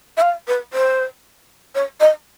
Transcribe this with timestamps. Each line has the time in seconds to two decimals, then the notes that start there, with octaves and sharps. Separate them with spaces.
0.17 E5
0.22 F5
0.48 B4
0.73 C5
1.75 C#5
2.00 D#5